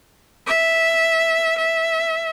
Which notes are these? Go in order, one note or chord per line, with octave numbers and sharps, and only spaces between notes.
E5
E5